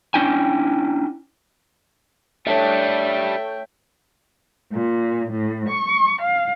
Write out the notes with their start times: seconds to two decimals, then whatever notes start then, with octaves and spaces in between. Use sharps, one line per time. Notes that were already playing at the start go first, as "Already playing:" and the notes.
0.14 C#4 D4 E4 G5 G#5
2.47 G3 A3 D4 C#5 E5 G5
4.73 A#2
5.30 A2
5.68 C#6
6.20 F5